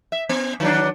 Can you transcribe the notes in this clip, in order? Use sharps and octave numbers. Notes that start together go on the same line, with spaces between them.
E5
B3
D#3 F#3 D4